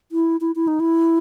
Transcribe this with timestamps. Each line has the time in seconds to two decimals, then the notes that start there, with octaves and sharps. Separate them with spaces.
0.12 E4
0.41 E4
0.56 E4
0.68 D#4
0.80 E4